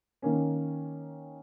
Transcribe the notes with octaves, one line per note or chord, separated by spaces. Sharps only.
D#3 A#3 C#4